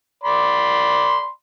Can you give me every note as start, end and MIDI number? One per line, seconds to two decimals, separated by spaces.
0.24 1.29 74
0.24 1.29 83
0.24 1.29 84